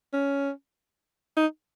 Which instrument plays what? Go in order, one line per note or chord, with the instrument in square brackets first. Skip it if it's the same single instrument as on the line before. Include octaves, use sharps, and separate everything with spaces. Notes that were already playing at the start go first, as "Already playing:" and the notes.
[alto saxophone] C#4
D#4